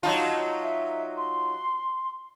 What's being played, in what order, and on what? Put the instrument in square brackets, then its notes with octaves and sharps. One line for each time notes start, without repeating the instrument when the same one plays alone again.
[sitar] F#3 D#4 F4 [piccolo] A5
[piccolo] E5
C6